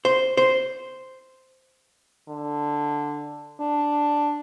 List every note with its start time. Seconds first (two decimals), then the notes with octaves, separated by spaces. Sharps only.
0.05 C5
0.37 C5
2.28 D3
3.60 D4